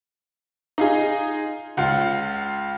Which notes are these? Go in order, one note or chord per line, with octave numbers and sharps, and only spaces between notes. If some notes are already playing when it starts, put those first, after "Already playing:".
D#4 F4 G#4
C#2 F4 F#5